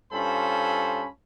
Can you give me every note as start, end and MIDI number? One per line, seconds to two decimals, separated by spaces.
0.13 1.05 43
0.13 1.05 61
0.13 1.05 65
0.13 1.05 69
0.13 1.05 72
0.13 1.05 83